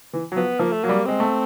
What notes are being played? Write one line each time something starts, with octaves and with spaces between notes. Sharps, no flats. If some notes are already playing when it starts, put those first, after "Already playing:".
E3
F#3
F3 B3
F3 A#3
A3
F#3 A#3
G3
G#3 C4
A3